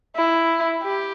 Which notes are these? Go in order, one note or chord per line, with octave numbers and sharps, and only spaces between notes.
E4
G4